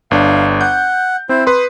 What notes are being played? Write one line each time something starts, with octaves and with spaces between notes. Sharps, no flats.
G1 D4 F5
F#5 G6
C4 E4 C5
B4 C6 D#6